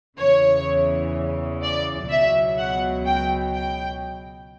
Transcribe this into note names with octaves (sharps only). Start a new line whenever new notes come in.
E2 C#3 E3 C#5
D5
C#2 B2 F#3 E5
F#5
G5
G5